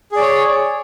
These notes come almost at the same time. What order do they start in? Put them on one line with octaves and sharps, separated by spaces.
G#4 D5 C#5